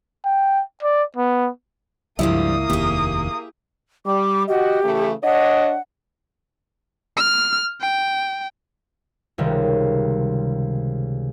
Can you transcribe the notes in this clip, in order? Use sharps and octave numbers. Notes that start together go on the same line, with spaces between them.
G5
D5
B3
C#2 G2 F3 G3 A#3 E4 D#6
F1 D#2 G4 G#4
G3 D6
F#4 G4 D#5
C#3 E3 A3
D4 C#5 D#5 F#5
F6
G5
C#2 C3 D#3 G3